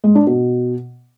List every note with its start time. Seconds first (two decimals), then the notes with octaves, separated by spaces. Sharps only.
0.04 G#3
0.15 D4
0.27 B2